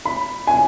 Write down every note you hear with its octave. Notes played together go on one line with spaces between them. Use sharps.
B5
G#5